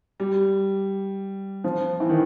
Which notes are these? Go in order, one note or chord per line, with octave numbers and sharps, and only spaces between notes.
G3
F3
E3
D#3